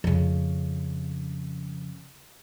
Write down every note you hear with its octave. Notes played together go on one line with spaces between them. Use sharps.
F2 C#3